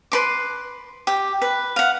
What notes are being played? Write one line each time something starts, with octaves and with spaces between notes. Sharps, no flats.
B4 C6 D6
G4
B4
F5 F#5